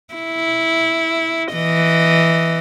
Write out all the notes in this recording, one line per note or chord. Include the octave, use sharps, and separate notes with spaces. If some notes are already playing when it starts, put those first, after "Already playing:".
E4
E3 D#5